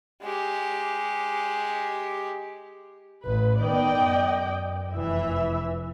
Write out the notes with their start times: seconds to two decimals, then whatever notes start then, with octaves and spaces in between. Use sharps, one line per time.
0.23 G#3 G4
3.25 A1 B4
3.62 D#3 B3 D5 D#5 G5
4.02 F#2
4.95 F1 E3 E5